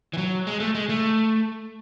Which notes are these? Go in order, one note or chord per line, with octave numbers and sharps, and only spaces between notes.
E3
F#3
G#3
A3
G#3
A3